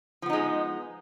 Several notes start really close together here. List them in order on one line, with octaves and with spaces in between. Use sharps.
F3 B3 D#4 G#3